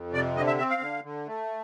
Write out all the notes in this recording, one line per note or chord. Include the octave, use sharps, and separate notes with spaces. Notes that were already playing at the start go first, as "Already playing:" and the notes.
Already playing: F2
C3 D5
D3 D#5
E5
C4 E5
F5
D3
D3
A3